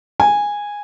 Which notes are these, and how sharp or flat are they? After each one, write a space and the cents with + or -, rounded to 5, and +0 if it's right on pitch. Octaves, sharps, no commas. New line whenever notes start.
G#5 -10